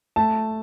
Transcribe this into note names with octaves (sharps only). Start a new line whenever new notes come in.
A3 A5